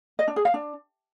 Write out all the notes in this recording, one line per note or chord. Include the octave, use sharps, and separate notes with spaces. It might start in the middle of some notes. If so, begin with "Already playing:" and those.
D#5
D4
G#4
F5
D4